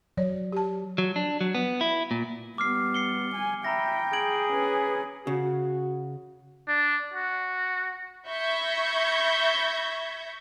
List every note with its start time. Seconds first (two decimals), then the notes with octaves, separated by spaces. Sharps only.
0.17 F#3 C#5 D5
0.52 G4 A5
0.98 F#3
1.16 D4
1.41 F#3
1.55 B3
1.81 E4
2.11 A#2
2.58 G3 B3 D6 F6 C7
2.94 C7 C#7 G7
3.34 G#5
3.65 E5 G5 A#5 B5 A#6
4.13 G#4 G#6 D7 F#7
4.49 C#4 B4
5.27 C#3 F#4
6.68 D4
7.14 F#4
8.28 E5 B5 C#6 G6 G#6 A#6